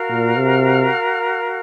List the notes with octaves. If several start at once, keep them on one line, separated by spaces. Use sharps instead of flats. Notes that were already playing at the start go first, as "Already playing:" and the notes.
Already playing: F#4 A#4 F5
A#2
C3